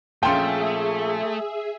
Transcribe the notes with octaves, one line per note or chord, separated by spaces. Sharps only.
A#2 F3 A3 C#4 G#4 E5 G5 C6